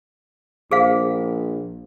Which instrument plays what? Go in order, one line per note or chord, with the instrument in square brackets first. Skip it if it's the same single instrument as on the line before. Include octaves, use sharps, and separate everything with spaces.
[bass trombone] A#1 [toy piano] G#4 C5 F5